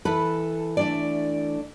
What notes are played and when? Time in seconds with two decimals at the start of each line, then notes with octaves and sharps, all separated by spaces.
0.05 E3 A4 B4
0.77 A3 D4 D5